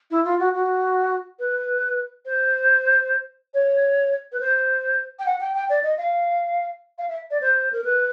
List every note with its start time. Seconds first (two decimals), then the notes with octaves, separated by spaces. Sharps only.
0.11 E4
0.25 F4
0.39 F#4
0.54 F#4
1.39 B4
2.25 C5
3.54 C#5
4.32 B4
4.40 C5
5.19 G5
5.26 F#5
5.40 G5
5.55 G5
5.69 D5
5.84 D#5
5.98 F5
6.98 F5
7.09 E5
7.30 D5
7.41 C5
7.72 A#4
7.84 B4